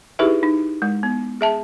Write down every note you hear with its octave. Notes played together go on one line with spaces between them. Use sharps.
D#4 E4 G4 G#4 B4 E5
D#4
G#3
B3
G#4 E5 A5